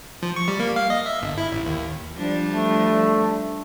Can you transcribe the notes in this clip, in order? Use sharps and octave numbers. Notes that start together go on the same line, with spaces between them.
F3
C#6
G3
A#3
F5
D#5
E5
G1
E4
A1
D#2
F3 G3 D4
A3